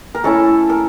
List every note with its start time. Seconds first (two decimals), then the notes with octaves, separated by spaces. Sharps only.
0.15 A#4
0.24 A3 C#4 E4 A4
0.69 A#4